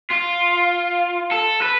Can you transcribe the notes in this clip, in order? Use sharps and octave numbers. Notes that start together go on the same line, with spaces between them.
F4
A4
B4